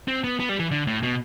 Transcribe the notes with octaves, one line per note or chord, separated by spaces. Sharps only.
C4
B3
B3
G3
E3
D3
A2
B2